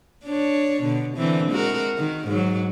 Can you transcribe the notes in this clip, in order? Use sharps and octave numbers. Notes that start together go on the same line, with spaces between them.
D4 C#5
B2 D3
D3 E3 C4
G#3 F#4 A#4
D#3
G#2 F#3